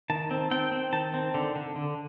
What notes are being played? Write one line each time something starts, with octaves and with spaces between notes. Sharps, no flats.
D#3 A5
C4
C4 G5
C4
D#3 A5
C4
D3
D3
D3